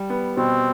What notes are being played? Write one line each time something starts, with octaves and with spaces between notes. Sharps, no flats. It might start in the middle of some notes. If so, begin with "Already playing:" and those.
Already playing: G3
B3
B2 C4